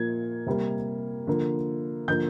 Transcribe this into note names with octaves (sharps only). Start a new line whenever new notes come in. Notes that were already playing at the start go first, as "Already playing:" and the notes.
Already playing: A#2 F3 A#3 G#6
C3 G3 A#3
D3 F3 A#3
D3 F3 A#3 G6